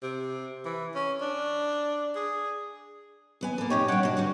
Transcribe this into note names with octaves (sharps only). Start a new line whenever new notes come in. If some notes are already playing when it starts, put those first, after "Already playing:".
C3
E3
C#4
D4
G#4
D#2 B3 G#5
A#3 A4
A#2 C4 D#4 G4 C#5
G3 D4 C#5 F#5 G5
B2 D4 F#4
D3 G3 B3